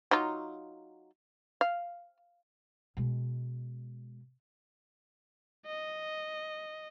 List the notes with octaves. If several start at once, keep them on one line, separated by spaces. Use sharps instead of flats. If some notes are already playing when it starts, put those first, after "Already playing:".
F#3 D#4 F4
F5
B2 G#3
D#5